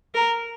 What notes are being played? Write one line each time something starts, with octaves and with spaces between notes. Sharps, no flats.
A#4